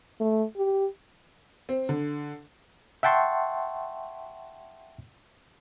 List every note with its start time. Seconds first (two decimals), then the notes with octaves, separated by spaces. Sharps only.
0.20 A3
0.56 G4
1.69 C4
1.89 D3
3.03 E5 F#5 G5 A5 C6 C#6